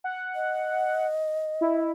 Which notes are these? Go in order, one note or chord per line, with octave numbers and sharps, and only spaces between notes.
F#5
D#5
E4